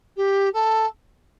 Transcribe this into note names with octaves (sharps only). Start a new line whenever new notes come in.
G4
A4